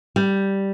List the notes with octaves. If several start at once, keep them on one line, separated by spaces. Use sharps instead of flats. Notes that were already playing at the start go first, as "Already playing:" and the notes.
G3